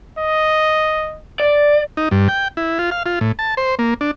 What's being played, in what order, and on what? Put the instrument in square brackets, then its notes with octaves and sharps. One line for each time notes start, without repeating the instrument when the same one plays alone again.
[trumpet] D#5
[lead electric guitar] D5
[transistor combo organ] D#4
G2
G5
E4
F4
F5
F4
A2
A5
C5
A#3
D4